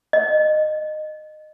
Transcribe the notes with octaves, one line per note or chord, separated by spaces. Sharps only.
D#5